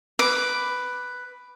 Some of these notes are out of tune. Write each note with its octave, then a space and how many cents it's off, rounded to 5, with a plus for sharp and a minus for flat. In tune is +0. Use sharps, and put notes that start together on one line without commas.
B4 +5 D6 +0